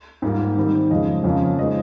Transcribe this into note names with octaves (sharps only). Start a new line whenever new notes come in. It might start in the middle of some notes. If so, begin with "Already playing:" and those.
G#2 G3 A#3 F4
D#3 G3 C4 D#4
F2 C#3 F3 G#3 D#5
F2 C#3 F3 A#3 C#4
F3 G#3 C4 D#4 D#5